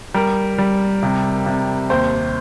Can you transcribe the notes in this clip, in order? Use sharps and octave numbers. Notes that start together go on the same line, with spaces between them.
G3 A#4
G3
C3
C3
D#2 C5